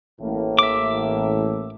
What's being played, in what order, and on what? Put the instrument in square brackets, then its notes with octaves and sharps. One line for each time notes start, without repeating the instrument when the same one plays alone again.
[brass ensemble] A1 A2 A#3
[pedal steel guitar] E5 D6